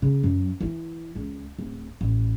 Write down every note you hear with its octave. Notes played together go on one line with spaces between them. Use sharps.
C#3
F#2 F#3
E3 E4
C#2
D1 C4
A1